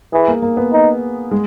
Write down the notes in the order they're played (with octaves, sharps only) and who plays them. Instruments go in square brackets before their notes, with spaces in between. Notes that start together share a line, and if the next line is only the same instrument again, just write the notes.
[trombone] E3 [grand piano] G#4
[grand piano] A#3
A#3
B3
[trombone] D#4
[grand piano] G#3